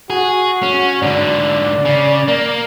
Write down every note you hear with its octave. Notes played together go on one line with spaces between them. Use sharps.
F#4 G#4
C#4
G#2 D3 D5
C#3
A#3